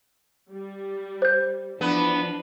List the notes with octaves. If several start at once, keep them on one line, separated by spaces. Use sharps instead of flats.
G3
C5 G6
E3 F3 B3 D4